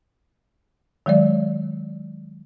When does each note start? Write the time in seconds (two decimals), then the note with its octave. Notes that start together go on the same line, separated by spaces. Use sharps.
1.06 D#3 F#3 G#3 D5